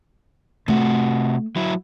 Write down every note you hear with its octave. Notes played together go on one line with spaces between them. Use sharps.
C3 A3 F#4
F#3 E4